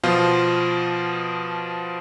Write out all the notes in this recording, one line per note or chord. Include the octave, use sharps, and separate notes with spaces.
B2 F3 F4 C5